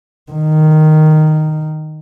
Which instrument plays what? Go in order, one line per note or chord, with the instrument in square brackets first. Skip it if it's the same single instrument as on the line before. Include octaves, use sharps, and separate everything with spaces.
[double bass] D#3